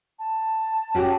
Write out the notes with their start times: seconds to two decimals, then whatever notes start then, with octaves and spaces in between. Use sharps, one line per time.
0.19 A5
0.94 C#4 F#4 G4